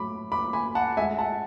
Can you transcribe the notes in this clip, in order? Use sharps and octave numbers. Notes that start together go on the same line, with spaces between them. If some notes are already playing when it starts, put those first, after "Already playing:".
Already playing: A2 F#3 A3 B5 D6
B5 D6
G#5 B5
F#5 A5
A2 G#3 E5 G#5
F#5 A5